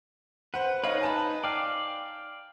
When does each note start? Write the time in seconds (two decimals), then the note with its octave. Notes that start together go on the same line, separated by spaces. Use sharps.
0.54 B4 C5 F#5
0.84 D#4 B4 C#5 D#5 F5
1.01 G#5 A5 B5
1.44 D5 F5 G5